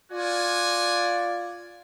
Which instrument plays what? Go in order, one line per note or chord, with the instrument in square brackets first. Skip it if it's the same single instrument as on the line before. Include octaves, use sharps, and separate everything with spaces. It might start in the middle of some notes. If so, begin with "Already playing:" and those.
[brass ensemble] F4 D5 [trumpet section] F#4 G#5